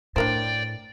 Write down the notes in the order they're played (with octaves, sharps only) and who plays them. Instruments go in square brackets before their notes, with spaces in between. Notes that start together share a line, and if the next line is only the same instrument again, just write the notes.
[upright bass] A2 [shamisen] D4 A#4 C5 [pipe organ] D5 G5